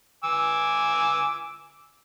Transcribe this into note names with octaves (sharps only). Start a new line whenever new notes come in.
G#5 D6 E6